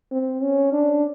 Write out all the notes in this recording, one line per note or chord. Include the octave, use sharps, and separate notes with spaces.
C4
C#4
D4